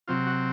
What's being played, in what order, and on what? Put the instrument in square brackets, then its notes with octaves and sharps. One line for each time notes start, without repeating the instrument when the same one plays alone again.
[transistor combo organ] C3 F#3 C4 F4
F#4